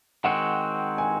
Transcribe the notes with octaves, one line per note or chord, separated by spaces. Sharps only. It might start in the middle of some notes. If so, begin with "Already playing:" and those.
D#3 G#3 C4 F#4 F#5
G#5